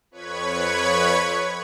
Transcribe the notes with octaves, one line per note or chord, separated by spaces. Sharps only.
F2 B4 C#5 B5 C#6 G#6